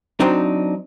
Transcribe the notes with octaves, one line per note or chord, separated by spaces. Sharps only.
F#3 C4 D4 D#4